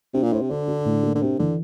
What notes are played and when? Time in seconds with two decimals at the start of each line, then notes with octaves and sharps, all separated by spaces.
0.14 C3 D4
0.23 A#2
0.32 A2 C5
0.42 C3
0.51 D3 D4
0.68 D4
0.85 A2
1.03 A#3
1.15 D3
1.22 C3 D4
1.39 D3 E3